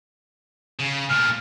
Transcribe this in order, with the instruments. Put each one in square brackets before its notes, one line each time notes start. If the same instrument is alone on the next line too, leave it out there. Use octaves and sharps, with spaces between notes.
[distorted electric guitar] C#3
[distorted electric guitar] A#2 A3 [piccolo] F6